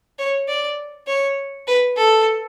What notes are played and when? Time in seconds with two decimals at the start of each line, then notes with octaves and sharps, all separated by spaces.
0.19 C#5
0.48 D5
1.07 C#5
1.67 B4
1.97 A4